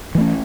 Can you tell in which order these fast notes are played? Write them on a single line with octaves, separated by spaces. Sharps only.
E3 A3 C#4